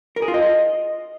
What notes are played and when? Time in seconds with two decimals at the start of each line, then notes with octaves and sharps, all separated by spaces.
0.16 A#4
0.22 G#4
0.28 F4
0.34 D#5